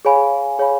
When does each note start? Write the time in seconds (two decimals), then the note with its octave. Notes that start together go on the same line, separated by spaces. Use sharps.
0.05 G#4 C#5 F5 G#5 B5
0.59 G#4 C#5 F5 G#5 B5